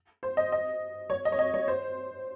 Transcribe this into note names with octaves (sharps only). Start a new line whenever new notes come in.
C5
D#5
D#5
C#5
D#5
C#5
D#5
C#5
C5